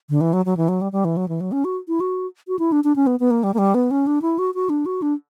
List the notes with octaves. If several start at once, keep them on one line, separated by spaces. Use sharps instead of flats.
D3
E3
F#3
F#3
E3
F#3
G3
G3
E3
F#3
E3
F#3
C#4
F#4
E4
F#4
F#4
E4
D4
D4
C#4
B3
B3
A#3
G3
A#3
G3
B3
C#4
D4
E4
F#4
F#4
D4
F#4
D4